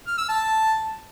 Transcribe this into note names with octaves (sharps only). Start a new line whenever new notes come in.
F6
E6
A5